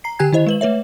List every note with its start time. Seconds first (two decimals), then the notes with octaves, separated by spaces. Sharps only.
0.04 A#5 C7
0.19 D3 G4 G5 G#5 F#6 G#6
0.33 D#3 E4 C5 D#5
0.46 G#3 B4 F#7
0.61 A3 B4 C#5 E5